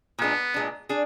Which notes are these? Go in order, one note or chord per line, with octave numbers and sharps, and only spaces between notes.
A#2 G#3 B3 D4
A#2 G#3 D4
D4 G#4